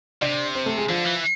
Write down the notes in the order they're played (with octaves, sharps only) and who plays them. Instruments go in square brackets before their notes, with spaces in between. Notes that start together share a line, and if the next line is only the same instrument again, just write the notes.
[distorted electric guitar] C3 [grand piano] D4 D5
[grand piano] C4 C5
A3 A4
G#3 G#4
[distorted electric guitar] D3 [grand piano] F3 F4
[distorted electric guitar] E3